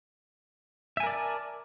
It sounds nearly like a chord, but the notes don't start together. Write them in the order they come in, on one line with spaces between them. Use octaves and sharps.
E5 G#5 A#4 D5 A5